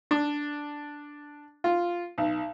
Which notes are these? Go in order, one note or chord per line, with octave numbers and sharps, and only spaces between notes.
D4
F4
B1